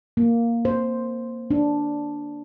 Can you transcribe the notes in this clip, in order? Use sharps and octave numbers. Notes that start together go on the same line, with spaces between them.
A#3
C5
D4